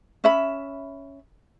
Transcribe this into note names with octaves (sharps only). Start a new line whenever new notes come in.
C#4 E5 B5